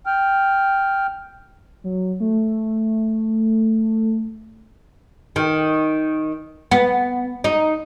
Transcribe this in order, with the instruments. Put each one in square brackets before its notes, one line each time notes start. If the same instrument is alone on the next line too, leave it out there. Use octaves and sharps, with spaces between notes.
[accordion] G5 F6
[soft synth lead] F#3
A3
[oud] D#3
B3
D#4